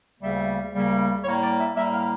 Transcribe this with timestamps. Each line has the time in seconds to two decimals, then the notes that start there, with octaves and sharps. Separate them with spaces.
0.20 D2 C#3 G3 A#3 E5
0.72 D2 C#3 G3 A#3
1.23 A2 G3 A#3 C#5
1.41 D5
1.58 E5
1.75 A2 G3 A#3 E5
1.92 F5